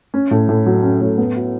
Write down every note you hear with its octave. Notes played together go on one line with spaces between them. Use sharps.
C#4
A2
A2
F#3
C#4
A2
B3
F#4